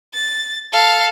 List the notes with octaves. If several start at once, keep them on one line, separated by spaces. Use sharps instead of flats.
A6
A4 F5